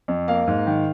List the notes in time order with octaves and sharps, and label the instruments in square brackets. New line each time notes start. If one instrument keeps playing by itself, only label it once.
[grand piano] F2
A#3 F5
G#2
D#3